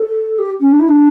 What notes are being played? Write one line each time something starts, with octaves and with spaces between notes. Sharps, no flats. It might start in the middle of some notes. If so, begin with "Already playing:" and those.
Already playing: A4
G4
C#4
D4
E4
D4